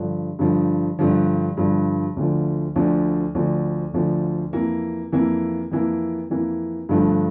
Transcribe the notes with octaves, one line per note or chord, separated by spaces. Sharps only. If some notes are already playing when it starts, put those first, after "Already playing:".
Already playing: G2 D3 F3
G2 D3 F3
G2 D3 F3
G2 D3 F3
D2 D3 F3
D2 D3 F3
D2 D3 F3
D2 D3 F3
F2 E3 A#3
F2 E3 A#3
F2 E3 A#3
F2 E3 A#3
G2 D3 F3 A3 D4